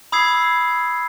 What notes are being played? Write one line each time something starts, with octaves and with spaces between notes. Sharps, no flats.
B5 D#6 E6 G#6 C7